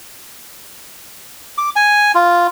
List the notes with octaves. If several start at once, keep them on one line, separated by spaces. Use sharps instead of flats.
D6
G#5
F4